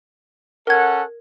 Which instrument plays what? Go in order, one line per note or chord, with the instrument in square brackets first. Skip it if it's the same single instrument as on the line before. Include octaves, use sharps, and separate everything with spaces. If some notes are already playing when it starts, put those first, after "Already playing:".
[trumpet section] C#4 A4 F#5 [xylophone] A#4 G#6